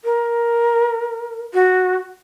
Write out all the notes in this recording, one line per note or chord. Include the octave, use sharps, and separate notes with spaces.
A#4
F#4